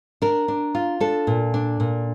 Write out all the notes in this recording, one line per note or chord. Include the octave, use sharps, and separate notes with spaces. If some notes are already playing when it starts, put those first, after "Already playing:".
D4 A#4
D4
F4
D4 A4
A#2
D4
A#2